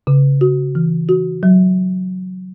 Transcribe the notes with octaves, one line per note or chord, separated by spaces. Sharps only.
C#3
F#4
E3
F#4
F#3